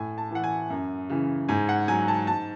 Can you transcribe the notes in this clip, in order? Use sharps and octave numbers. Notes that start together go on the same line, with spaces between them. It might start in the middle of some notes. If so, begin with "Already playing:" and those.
Already playing: A2 G#5
A5
E3 F#5
G#5
F#2
C#3 E3
G#2 G#5
F#5
F#3 G#5
A5
G#2 A5